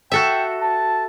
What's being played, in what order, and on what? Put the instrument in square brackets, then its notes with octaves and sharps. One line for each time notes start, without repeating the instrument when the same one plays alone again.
[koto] F#4 A4 E5 [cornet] G5
[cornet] A5